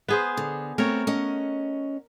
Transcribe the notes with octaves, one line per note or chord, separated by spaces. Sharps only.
B3 G#4 C5
D3
A3 B3 C4 A#4 C#5
C#4 D#5 F#5